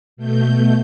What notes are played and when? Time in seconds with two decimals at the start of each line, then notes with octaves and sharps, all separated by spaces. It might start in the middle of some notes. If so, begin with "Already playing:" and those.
0.17 B2 A3 G6